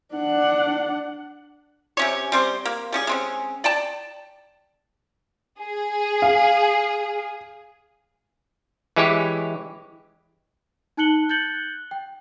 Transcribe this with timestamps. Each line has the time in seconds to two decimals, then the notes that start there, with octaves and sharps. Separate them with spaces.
0.15 D4 F#5
1.97 C3 C#4 C#5
2.32 G3 C4 C5
2.65 A#3
2.92 G3 C#4 G#4
3.07 G#3 C4 C#4
3.64 D5 G5 A5
5.61 G#4
6.22 F5
8.96 E3 G#3 E4 G4 C#5
10.97 D#4 A5 F#6 C#7 F#7 G7
11.29 F#6 G6 A6 C#7 F#7 G7
11.91 G5